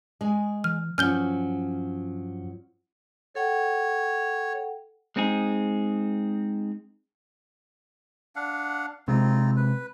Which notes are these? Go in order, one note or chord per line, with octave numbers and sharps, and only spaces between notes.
G#3 G#4
E3 F6
G2 F3 F#3 C#4 F6 G6 G7
A4 C#5 F#5 G5
G#3 C4 D#4 G#4
D4 F5 F#5
C3 G#3 C4 D#4 F4
B4